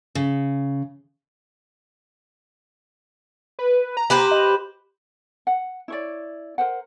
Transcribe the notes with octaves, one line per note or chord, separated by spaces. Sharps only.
C#3
B4
A#5
G4 B4 C5
D#5
F#5
E4 C#5 D5
A#4 C5 F#5